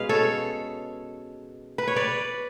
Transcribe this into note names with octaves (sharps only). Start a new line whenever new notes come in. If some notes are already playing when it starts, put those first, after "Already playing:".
Already playing: B2 G#3 C#4 B4 F5
A4 C#5
B4
C#5
B4 D5